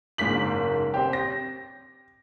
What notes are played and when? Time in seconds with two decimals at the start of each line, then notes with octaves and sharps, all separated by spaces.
0.18 F#1 G#2 A#3 B6 F#7
0.94 C4 G4
1.13 A#6